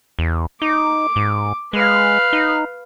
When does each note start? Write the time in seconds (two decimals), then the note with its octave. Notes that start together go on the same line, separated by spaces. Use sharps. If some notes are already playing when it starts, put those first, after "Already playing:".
0.19 E2
0.62 D#4 D6
1.16 G#2
1.73 G#3 B4 F5
2.33 D#4